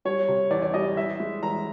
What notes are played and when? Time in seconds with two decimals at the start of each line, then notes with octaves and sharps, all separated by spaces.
0.05 G3 C#5
0.28 C3
0.51 E2 D5
0.62 D5
0.74 G3 D#5
0.97 E2 E5
1.20 G#3
1.43 E2 A#5